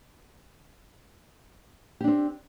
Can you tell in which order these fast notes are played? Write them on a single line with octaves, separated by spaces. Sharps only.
G4 D4 C4